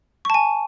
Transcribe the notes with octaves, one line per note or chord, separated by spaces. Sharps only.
G#5 A5 C#6